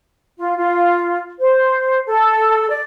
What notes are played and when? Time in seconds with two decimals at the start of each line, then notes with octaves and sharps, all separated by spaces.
0.38 F4
0.57 F4
1.40 C5
2.06 A4
2.69 D5